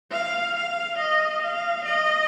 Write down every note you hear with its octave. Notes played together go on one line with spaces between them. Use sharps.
F5
F5
D#5
F5
D#5